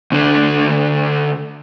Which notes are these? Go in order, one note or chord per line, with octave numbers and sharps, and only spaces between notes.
D2 D3